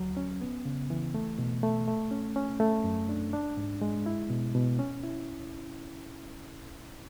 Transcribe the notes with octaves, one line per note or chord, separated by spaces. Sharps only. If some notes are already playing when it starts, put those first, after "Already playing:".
Already playing: D2 F#3
C#4
B3
C#3
E3
A3
B2
A3
A3
C#4
C#4
A3
F#2
D4
D4
G#2
G#3
E4
B2
B2
C#4
E4